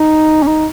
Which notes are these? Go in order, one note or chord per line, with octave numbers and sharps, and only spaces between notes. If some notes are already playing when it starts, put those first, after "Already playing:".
Already playing: D#4
C#4
D#4